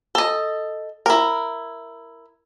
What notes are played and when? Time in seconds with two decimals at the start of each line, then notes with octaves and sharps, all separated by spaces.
0.15 A4 D#5
1.06 E4 A#4